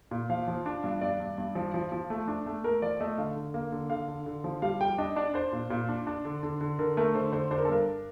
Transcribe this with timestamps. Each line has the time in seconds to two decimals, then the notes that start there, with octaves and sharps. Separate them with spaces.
0.11 A#2
0.30 F3 F5
0.48 F3
0.66 D4
0.84 G2
1.01 G2 D5
1.20 G2
1.38 G2
1.55 F3
1.74 F3
1.92 F3
2.10 A3
2.28 D4
2.46 A3
2.64 A3 A#4
2.82 F3 D5
3.00 A3 D#5
3.18 D3 F5
3.36 D3
3.54 A#3
3.72 D3
3.90 D3 F5
4.08 D3
4.26 D3
4.44 F3
4.62 G3 F5
4.81 G3 G5
4.98 D4 D#5
5.16 D4 D5
5.34 D4 C5
5.52 A#2
5.70 A#2
5.89 D4
6.07 D4
6.25 D3
6.43 D3
6.61 D3
6.79 D3 A#4
6.97 A3 A#4
7.15 D3 C5
7.32 D3 C5
7.51 D4 C5
7.58 A#4
7.65 A4
7.69 G2 A#4